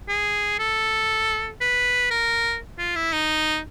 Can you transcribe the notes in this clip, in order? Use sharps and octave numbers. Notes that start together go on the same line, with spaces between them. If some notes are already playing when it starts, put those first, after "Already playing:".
G#4
A4
B4
A#4
F4
E4
D#4